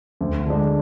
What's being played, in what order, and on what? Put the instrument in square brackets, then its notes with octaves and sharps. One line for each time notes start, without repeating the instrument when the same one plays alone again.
[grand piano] D2
D3 G#3 D4